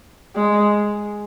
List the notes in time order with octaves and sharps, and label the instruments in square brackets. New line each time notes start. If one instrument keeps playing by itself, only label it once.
[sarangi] G#3